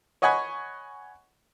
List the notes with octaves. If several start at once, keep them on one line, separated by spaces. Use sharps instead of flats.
C#5 D#5 F#5 G#5 B5 C#6